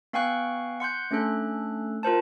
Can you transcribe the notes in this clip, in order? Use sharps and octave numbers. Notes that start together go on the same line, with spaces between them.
B3 F5 G5 G#5 C#6 F#6
F#5 C6 F#6 G6
A3 C#4 D4 A4 F#6
F4 A#4 C5 A5